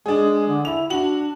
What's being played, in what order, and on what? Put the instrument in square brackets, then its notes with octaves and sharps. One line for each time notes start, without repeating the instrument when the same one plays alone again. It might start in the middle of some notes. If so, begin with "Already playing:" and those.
[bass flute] G#3 [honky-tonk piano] D4 G#4
[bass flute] D3
[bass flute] E4 [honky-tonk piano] F7
[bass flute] D4 [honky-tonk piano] F#4 F#7